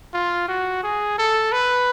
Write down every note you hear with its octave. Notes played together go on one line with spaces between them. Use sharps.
F4
F#4
G#4
A4
B4